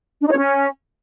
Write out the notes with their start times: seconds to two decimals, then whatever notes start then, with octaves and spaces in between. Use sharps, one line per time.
0.21 D4
0.26 D#4
0.31 C#5
0.37 C#4